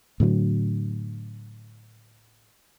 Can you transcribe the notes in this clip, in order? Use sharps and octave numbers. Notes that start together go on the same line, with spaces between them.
A2 D3 F#3